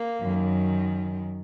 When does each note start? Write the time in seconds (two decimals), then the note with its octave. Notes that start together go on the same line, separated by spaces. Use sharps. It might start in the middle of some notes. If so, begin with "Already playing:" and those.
Already playing: A#3
0.21 F#2 D#3